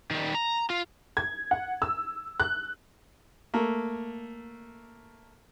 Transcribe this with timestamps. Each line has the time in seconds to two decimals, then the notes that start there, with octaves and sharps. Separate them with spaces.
0.11 D#3 G3
0.35 A#5
0.70 F4
1.17 G#6
1.51 F#5
1.82 E6
2.40 F#6
3.54 A3 A#3